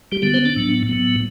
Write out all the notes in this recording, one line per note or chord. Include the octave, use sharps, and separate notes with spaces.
G3 G4
D3 G3 B3 G4
C4 C5
D4
A2 F#3 B3
A2 F#3 B3